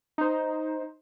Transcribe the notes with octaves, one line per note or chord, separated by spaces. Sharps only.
D#4 C5